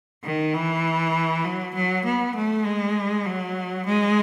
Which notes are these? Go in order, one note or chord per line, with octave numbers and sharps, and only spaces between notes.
D#3
E3
F#3
F#3
B3
A3
G#3
F#3
G#3